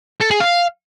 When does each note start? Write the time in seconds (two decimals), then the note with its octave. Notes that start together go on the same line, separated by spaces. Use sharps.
0.21 A4
0.31 G#4
0.40 F5